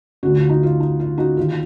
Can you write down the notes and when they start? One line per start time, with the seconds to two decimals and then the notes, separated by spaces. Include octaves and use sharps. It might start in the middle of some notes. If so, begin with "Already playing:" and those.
0.23 D2 D3 F#4
0.37 F4
0.49 D#4
0.63 F4
0.80 D#4
1.00 F4
1.18 D#4 F#4
1.37 D#2 D#3 F4
1.48 F4